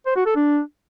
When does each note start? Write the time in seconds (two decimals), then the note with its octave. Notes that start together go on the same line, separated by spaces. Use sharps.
0.06 C5
0.16 F#4
0.26 A4
0.36 D4